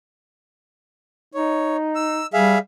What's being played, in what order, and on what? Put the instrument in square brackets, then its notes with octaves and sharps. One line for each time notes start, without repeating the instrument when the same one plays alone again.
[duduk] D#4 [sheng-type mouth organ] C#5
[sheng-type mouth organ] E6
[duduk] G3 [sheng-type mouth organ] G#4 E5 F5